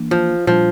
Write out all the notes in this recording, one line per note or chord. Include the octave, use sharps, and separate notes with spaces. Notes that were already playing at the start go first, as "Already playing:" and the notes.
Already playing: E3 A#3 D4
F3
A#2 F3 G3 D4